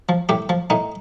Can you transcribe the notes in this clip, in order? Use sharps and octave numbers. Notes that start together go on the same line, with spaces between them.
F3
A2 G4
F3
A2 D#4